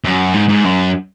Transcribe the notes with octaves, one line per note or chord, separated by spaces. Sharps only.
F#2
G#2
G#2
F#2